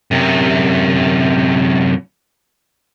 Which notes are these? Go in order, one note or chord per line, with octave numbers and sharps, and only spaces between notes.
F#2 C3